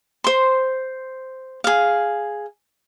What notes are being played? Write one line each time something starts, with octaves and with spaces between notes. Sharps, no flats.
C5 C6
G#4 F5